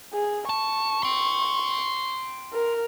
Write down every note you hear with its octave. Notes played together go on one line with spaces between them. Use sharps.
G#4
A5 C#6
G5 C6
A#4